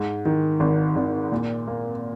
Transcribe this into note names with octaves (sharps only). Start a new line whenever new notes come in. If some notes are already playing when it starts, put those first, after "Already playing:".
Already playing: G#2
D#3
G#1
G#1
A#2
A#3